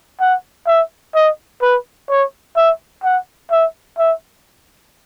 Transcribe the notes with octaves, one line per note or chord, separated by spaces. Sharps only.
F#5
E5
D#5
B4
C#5
E5
F#5
E5
E5